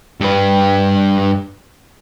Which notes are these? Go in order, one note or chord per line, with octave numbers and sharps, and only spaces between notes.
G2 B4